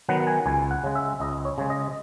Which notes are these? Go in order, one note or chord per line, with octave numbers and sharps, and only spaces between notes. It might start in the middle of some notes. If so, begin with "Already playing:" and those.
D#3 F#3 B3 F#5
F#5
G#5
C#2 G#5
F#5
C#3 G#3
E5
C#2 D#5
C#5
C#3 G#3
D#5